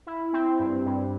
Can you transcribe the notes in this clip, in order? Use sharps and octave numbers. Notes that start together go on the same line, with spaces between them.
E4
C4
G2
G2